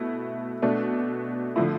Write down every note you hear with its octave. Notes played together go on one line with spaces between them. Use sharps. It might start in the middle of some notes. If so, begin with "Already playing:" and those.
Already playing: B2 A3 E4
B2 A3 D4
D3 F3 A3 E4